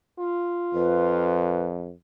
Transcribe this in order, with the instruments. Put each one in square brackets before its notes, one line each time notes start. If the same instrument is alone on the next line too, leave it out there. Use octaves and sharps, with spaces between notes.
[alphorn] F4
[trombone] F2 [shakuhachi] B4